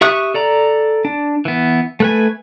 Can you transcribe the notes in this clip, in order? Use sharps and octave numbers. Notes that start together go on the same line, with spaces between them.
G4 E5 C#6 D#6 F#6
A4 D5 A#5
D4
E3 B3
A3 B4 G#5